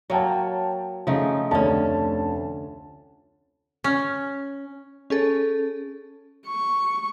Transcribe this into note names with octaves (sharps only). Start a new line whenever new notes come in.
F#3 A#3 C#5 G5 A5
C#3 F3 A3 D#4
F1 D2 D3 C#4 A5
C#4
C#4 G#4 A4
C#6